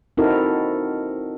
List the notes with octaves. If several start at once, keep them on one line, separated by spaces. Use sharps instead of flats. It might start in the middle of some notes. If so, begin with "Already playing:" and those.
C4 D#4 E4 F#4 A4 A#4